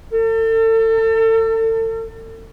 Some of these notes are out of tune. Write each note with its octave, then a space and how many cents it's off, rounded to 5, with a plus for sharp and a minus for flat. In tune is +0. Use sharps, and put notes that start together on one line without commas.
A4 +35